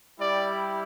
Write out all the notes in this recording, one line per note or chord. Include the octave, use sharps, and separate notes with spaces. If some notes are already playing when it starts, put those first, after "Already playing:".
G3 E4 G4 D5